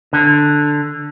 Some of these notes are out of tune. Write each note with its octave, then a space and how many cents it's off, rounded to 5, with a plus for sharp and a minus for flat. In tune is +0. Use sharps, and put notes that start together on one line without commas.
D3 +5